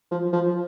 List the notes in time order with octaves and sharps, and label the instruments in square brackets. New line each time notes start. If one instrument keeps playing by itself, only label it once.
[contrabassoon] F3
F3